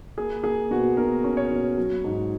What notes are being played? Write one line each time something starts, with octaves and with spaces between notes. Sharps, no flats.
A#3 G#4
A#3 G#4
B2 F#4
B2 A#4
C#4
C#5
B2
F#3
G#2